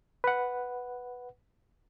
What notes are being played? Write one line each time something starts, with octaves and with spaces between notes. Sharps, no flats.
B4 F#5